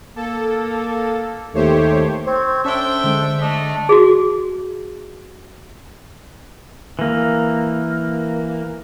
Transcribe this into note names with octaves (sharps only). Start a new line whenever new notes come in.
A#3 A4
D#2 A3 G4 C5 C#5
C4 C5 C#5
C#4 D4 A4 E5 G5
D3 G#3
A3 D4 D#5
F#4 G#4
E3 A#3